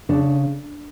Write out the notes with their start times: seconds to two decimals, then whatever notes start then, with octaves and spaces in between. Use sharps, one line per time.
0.09 C#3 D4